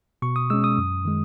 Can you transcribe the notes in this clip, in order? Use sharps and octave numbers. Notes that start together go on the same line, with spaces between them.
B2 C#6
D#6
G#3 C#4 E6
D#6
F#2
D#3 G#3